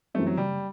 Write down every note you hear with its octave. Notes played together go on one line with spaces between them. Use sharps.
F#2 E3 G3 A3 C4
F#3
F#1 G3